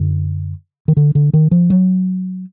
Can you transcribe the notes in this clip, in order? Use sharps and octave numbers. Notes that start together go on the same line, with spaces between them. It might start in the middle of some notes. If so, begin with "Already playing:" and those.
Already playing: F#2 D3
D#3
D3
D3
D#3
F3
F#3